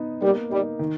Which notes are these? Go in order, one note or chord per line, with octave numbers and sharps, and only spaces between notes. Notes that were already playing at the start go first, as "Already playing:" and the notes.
Already playing: B3 D#4
G3 A#3
G3 D#4
D#3